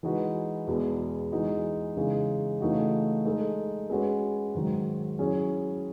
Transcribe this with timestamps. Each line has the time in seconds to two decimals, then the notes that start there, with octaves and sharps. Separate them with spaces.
0.03 E3 G#3 D#4 F#4 B4
0.67 E2 B2 G#3 B3
1.32 E3 G#3 D#4 F#4
1.97 C#3 E3 G#3 D#4
2.61 C#3 E3 A3 D#4 F#4
3.25 G#3 D#4 A4
3.90 G#3 C#4 F#4 B4
4.54 G#2 D#3 F#3
5.19 F#3 C#4 E4 G#4